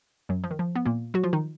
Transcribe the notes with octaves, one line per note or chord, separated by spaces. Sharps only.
F#2 F#3
F3
D#3
F3
B3
A#2 A#3
F#3 F#4
F3 F4
D#3 D#4